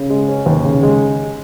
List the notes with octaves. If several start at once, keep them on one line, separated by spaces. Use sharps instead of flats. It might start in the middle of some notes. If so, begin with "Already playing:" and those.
Already playing: C#3
G#3
C#4
D#2
C#3
G#3